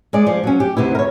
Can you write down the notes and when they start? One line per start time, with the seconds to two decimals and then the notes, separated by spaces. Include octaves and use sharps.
0.13 G#3 G#4 D5
0.27 F3
0.43 F#3 C#4
0.60 G4
0.77 D2 C3 B3 E4
0.95 A#4 C#5